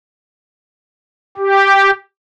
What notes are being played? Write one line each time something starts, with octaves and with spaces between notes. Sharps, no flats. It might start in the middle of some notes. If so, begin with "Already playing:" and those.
G4